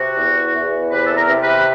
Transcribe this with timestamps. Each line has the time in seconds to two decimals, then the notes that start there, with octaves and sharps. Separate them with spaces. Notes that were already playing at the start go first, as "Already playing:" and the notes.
Already playing: C3 F#4
0.17 E2
0.55 E2
0.91 C3 B4
1.06 A4
1.17 A#4
1.29 C3
1.42 B4